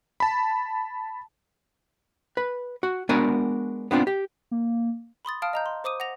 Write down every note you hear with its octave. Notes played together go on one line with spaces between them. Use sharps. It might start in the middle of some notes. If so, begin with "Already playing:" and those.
A5 B5
B4
F#4
G#3 B3 D4 F#4 A#4 G#5
B3 C4 D4 F4
G4
A#3
B5 C6 D#6 A6
F5 A5 D#6 F6 D7
D#5 A#5 G6
C6
C5 D6 D#6 D#7
F#5 A#6 F7